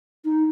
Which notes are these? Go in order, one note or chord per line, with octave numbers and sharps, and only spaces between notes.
D#4